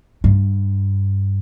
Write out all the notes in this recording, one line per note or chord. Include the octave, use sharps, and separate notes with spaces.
G2